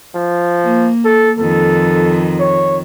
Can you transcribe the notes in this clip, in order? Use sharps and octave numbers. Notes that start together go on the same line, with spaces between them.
F3
A#3
A4
F2 D#3 A4
C#5